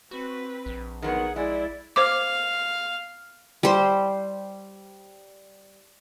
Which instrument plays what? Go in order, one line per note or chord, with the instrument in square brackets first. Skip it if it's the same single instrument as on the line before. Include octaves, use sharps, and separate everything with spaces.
[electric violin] C4 B4 [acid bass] F#4
[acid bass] A#1
[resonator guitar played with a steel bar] D#3 F#3 B3 [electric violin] G#4 [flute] F#5
[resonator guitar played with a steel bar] G#3 [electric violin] E4 [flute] D5
[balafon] C5 D6 [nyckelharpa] F5
[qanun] G3 C5